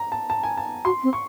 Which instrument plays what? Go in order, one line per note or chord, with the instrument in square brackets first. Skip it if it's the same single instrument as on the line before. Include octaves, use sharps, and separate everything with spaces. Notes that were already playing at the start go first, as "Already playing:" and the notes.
Already playing: [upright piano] A#5
A5
A5
G#5
A5
[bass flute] F#4 [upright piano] C6
[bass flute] C4
[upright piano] C#6